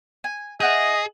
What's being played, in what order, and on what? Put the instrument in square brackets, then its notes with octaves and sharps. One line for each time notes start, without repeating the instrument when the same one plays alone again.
[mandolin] G#5
[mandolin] E4 F#5 G6 [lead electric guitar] G#4 [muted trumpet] D#5